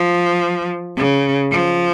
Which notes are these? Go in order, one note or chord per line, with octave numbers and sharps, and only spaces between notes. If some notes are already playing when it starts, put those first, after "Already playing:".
Already playing: F3
C#3
F3